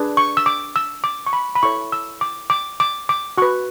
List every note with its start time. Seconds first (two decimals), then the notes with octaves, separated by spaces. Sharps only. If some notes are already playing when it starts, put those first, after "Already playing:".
Already playing: D4 G#4 B4
0.17 C#6
0.37 E6
0.46 D6
0.76 E6
1.04 D6
1.27 C#6
1.33 B5
1.55 B5
1.63 E4 A4 C#5 C#6
1.92 E6
2.21 D6
2.50 D6
2.80 D6
3.09 D6
3.38 F#4 B4 C#6